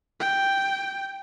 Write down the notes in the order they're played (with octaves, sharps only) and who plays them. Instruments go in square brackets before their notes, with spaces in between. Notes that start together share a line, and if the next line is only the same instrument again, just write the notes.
[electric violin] G5